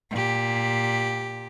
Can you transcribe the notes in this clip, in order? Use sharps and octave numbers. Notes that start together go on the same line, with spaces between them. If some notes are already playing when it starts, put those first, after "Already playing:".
A#2 G4